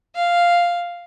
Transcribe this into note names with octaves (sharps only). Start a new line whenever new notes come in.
F5